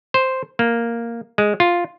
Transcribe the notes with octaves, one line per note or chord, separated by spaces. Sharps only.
C5
A#3
G#3
F4